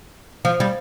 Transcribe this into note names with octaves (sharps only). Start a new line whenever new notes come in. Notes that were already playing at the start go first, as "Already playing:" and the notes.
F3
G3